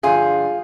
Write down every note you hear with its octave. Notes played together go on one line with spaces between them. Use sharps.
G2 D3 F3 F4 G#4